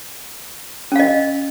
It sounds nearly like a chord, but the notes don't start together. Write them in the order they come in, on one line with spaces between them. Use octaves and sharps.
C#4 F5 D#5